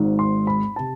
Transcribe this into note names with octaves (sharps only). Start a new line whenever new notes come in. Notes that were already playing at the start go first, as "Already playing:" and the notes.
Already playing: G#1 G#2 G#3
C6
B5
C3 A5